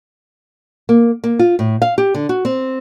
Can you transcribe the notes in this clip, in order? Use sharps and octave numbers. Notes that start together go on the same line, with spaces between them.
A#3
A#3
F4
A2
F5
G4
D3
F#4
C4